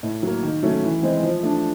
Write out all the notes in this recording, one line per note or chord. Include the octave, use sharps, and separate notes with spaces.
A2
F#3 A#3
D#3
F#3 A3 C#4
E3
G#3 C4
F3
A3 D4